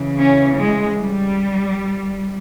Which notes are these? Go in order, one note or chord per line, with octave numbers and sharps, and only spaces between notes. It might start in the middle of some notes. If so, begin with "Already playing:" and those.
Already playing: C#3 E3
C#4
G#3
G3